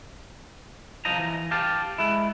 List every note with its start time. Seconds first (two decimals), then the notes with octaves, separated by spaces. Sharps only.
1.05 C2 F3 D#4 D#5 A#5
1.17 E3
1.51 G4 F5 G5 A5
1.98 G#3 E4